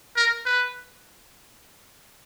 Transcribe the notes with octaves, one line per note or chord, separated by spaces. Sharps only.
A#4
B4